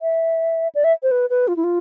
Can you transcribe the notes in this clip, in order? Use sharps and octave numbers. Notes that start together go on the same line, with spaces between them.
E5
D5
E5
C5
B4
B4
F4
E4
F4